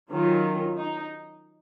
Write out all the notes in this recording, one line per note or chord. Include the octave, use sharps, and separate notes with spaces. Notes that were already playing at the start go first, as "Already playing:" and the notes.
D#3 F#3 C#4 F4
D#4